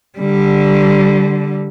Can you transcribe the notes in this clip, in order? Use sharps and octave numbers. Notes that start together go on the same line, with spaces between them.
D3 G3